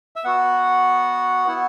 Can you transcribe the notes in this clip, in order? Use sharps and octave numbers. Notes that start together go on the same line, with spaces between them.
E5
B3 F#4 F#5
B3 E4